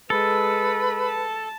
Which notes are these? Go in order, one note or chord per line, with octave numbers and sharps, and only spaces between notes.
G#3 A4 B4
A5